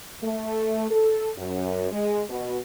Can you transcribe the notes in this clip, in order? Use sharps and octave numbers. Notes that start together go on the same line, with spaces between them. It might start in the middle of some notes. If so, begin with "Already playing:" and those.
A3
A4
F#2
G#3
B2